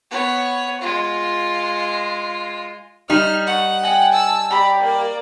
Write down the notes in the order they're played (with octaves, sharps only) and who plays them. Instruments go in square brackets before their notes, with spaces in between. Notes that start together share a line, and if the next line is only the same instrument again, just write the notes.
[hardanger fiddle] B3 C#5
G#3 F4
[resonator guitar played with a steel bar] G3 D#4 [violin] F6
[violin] F#5 [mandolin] C#6
[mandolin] G5 G#5
[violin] A5 E6
[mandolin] G4 A#5 B5 [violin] D5
[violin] A#3 D5